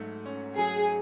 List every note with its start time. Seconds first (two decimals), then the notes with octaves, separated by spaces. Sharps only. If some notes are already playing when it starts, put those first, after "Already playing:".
Already playing: G#2 F#3 A3
0.26 C#4
0.58 F#3 G#4